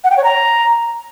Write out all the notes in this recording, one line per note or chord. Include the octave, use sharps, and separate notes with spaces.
F#5
G5
C#5
A#5